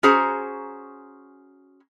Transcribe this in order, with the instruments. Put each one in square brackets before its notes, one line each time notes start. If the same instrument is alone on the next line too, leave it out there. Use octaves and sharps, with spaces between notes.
[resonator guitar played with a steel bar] C#4 F#4 G#4 C5 A#5